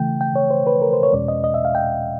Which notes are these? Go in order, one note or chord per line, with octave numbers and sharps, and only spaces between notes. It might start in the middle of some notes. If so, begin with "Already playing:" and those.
Already playing: C#3 E3 A3 G5
G5
C#5
C5
B4
A#4
C5
C#5
E2 B2 G#3 C#4 D5
D#5
D#5
E5
F5
G5